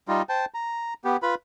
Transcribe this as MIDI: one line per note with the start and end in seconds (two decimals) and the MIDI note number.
0.08 0.22 55
0.08 0.22 63
0.08 0.22 65
0.29 0.45 72
0.29 0.45 79
0.29 0.45 81
0.54 0.94 82
1.05 1.17 59
1.05 1.17 67
1.22 1.35 65
1.22 1.35 71
1.22 1.35 83